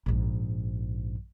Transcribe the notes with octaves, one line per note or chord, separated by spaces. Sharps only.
A#1 G#2